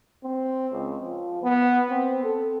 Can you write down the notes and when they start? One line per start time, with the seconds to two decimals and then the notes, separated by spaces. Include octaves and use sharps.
0.24 C4
0.72 C#2
1.02 F3
1.43 B3
1.90 C4
2.24 A4